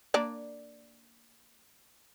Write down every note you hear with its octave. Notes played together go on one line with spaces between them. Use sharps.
A#3 D4 D5